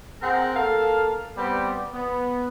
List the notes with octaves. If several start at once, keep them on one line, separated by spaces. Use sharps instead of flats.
C4 G#4 A#4 F#5
A#3 A4 F5
G3 B3 C4 G4 D5
B3